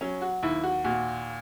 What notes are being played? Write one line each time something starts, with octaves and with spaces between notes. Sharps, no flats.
F#3 C#4
F#4
D#2 E4
F#4
A#2 F#4